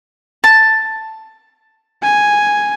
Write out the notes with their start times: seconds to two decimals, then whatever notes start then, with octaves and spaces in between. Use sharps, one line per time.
0.44 A5
2.02 G#5